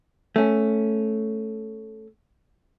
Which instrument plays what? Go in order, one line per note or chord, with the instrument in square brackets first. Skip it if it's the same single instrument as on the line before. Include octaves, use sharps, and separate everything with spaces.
[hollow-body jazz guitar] A3 C#4